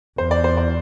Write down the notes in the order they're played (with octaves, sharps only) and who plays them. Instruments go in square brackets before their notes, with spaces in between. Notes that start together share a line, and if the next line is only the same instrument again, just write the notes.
[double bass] E2 [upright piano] C5
[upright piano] D5
C5
D5